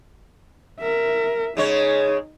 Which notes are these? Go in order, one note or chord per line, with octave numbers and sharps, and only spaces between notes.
A#4 E5
C#3 G#3 D#4 C#5